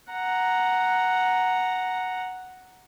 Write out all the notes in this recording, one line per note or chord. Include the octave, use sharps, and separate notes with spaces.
F#5 A#5